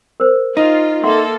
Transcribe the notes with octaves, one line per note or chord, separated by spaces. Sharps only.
A#4 C5
D#4 F4
A#3 A4 E5 F#5 C6